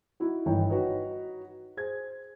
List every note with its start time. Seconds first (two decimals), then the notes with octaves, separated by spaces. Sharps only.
0.20 D#4 E4 F#4
0.46 G1 D#3 E3 D#4 C#5 G5
0.69 D#4 F#4 B4 C#5 D#5
1.77 G#4 C5 G#6